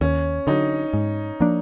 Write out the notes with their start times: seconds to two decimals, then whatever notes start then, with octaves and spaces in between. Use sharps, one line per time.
0.01 D#2 C#4
0.47 D3 F#3 D#4
0.93 G#2
1.40 F3 A#3 D4